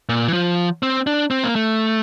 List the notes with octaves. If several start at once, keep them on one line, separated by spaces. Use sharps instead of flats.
A#2
E3
F3
C4
D4
C4
A#3
A3